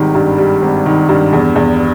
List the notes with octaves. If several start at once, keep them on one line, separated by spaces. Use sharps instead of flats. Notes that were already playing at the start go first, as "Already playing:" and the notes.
Already playing: G#1 D#3 G3
G2
G3
G#1
D#3
G2
E2
E2